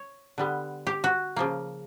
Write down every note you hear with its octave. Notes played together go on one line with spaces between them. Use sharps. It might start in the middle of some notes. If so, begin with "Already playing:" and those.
Already playing: C#5
D3 G3 B3
G4
F#4
C#3 F3 A#3